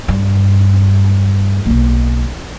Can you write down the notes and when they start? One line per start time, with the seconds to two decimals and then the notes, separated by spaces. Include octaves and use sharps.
0.08 G2
1.66 B1 A#3